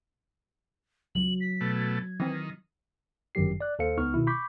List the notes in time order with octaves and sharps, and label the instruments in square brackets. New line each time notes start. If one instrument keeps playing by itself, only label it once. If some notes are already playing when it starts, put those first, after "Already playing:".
[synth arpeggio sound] C#2 [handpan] F#3 [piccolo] F#7
[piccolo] B6
[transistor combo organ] B2 A3
[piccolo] G#6
[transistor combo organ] D#3 [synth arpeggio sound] E3 C4
[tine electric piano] G1 F#2 D#3 F#3 G4 C7
D5 F#6
D#2 A4 C5 F5 C#7
C#2 B3 D#4 C#6 F6
B2 D#3 E4
B5 C#6 D6 G6 B6